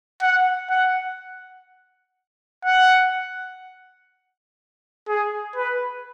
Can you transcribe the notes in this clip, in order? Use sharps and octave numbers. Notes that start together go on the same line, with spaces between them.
F#5
F#5
F#5
G#4
B4